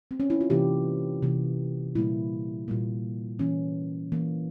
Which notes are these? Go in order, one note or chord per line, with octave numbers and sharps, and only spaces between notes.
C4
C#4
E4
F4
C3 E3 A#3 G4
C3 E3 A#3
A#2 G3 A#3 E4
A#2 G3 A#3
E3 A#3 C#4
E3 A#3